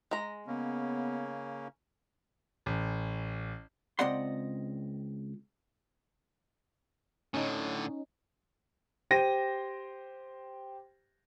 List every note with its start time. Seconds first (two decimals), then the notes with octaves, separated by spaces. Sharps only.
0.11 G#3 A#5
0.47 C#3 A#3 B3 C#4
2.66 A1
3.99 C#2 C4 D5 D#5 F#5 C6
7.34 A2 D3 C#4 D#4
9.11 G4 C5 G5 A#6 D#7